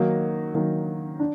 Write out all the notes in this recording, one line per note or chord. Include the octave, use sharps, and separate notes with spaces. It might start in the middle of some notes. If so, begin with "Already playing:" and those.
Already playing: D#3 F#3 A#3 D#4
D#3 F#3 A#3 D#4
D4